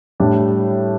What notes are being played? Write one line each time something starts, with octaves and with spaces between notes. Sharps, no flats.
A2 G3 D4